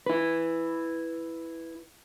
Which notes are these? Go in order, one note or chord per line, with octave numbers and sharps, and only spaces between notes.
E4 B4